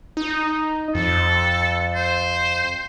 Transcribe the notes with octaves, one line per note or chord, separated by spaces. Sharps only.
D#4
F2 A4
C5